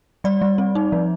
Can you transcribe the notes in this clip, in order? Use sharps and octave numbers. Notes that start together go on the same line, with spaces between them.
G3 D5
G3
C4
D#4
F3